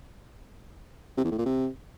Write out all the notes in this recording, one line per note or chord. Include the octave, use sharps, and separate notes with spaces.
C3
E2
A2
A#2
C3